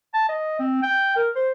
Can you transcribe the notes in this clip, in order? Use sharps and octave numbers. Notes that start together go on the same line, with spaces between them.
A5
D#5
C4
G5
A#4
C5